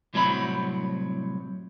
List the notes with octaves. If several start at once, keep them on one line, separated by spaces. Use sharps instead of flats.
C2 A2 F#3 C4 D#5 B5